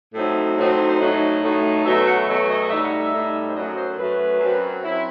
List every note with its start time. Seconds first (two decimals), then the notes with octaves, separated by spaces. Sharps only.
0.14 A2 F#3 C4 D#4 E5
0.57 A2 F#3 C4 D#4
0.88 C5
0.99 A2 F#3 A3 D#4 D#5
1.42 A2 F#3 A3 D#4
1.84 E2 B2 F#3 A3 E5
2.06 F#5
2.27 E2 B2 F#3 A3 E5
2.49 D#5
2.63 D#5
2.70 A2 G3 D#4 E5
2.84 F#5
2.98 E5
3.12 A2 G3 D#4
3.48 C5
3.55 F#2 F#3 A3 D#5
3.76 C5
3.98 F#2 F#3 A3 B4
4.40 F#2 F#3 C4
4.83 F#2 F#3 C4 E4